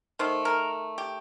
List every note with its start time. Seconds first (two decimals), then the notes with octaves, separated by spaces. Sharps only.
0.19 D#3 A3 C5
0.45 A#4
0.98 G4